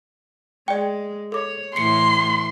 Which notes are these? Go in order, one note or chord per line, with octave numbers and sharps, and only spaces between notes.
G#3 D5 G5
A4 C#5 D6
A2 E3 E4 C6 C7 C#7